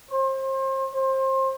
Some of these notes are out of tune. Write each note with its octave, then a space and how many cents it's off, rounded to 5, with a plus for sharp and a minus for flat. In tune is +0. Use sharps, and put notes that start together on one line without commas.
C5 +35
C5 +25